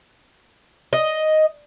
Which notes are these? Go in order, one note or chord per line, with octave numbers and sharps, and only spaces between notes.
D#5